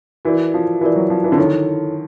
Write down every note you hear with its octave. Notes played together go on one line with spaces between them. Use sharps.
E3 F#4 A#4 D5
F3
E3 F#4 A#4 D5
F#3
F3
E3
D3
D#3 E4 A4 C#5